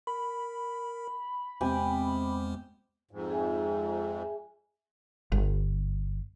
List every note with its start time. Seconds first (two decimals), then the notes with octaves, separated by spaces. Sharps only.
0.07 A#4 B5
1.61 E2 C3 G#3 B3 G4 G#5 B5
3.11 F2 G#2
3.30 G#4 E5 G#5
5.32 G1